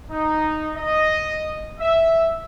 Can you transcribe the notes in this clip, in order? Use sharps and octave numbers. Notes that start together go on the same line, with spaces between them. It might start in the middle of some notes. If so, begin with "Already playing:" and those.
D#4
D#5
E5